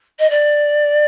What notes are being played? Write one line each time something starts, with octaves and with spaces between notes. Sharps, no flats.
D#5
D5